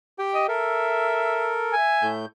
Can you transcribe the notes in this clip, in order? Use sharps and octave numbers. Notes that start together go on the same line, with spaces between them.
G4 G5
D#5
A4 A#4 E5
E5 G#5
A2 A3 G6